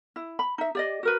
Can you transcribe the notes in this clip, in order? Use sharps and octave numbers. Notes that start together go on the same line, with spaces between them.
E4
B5
D#4 E5
G4 D5 D#5
F#4 A#4 B4